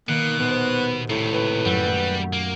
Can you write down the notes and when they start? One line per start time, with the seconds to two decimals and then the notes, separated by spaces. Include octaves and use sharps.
0.09 B2 D#3 A#3 F#6
0.40 D#1 B3 C5
1.10 C#2 A2 C3
1.33 B4
1.65 F#2 F#3 G3 A3
2.33 A#3